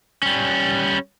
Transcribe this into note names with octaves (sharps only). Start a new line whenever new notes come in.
G3 C#4